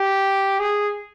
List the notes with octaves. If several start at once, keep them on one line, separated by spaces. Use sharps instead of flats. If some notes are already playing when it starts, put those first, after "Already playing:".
Already playing: G4
G#4